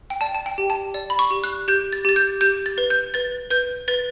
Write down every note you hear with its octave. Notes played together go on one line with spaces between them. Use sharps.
G5
D5 A5
A5
G5
G4
A5
D5
B5
C#6
G4
F#6
G4 G6
A6
G4 A6
G6
G4 G6
A6
B4
G6
B4 A6
B4 G6
B4 A6